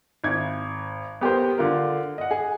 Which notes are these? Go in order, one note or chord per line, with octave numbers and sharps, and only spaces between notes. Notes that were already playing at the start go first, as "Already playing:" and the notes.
G#1 G#6
B3 G4 A#4 C5
D3 F4 A#4
D#5 F#5
G#4